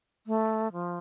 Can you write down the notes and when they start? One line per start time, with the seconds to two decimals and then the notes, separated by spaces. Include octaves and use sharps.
0.27 A3
0.73 F3